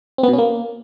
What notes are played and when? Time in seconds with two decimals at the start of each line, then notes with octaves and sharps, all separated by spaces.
0.18 C4
0.23 B3
0.28 B2
0.33 C#4
0.38 A#3